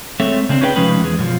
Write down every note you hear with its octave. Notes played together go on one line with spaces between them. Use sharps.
G#3 A3 C4 A4 C#5 E5
C#3 C4 D4
C#4 D#4 G#4 B4 F5 G5
C3 F3 G#3 C#4 D#4 B4
E2 G#3
F#2 B2 F3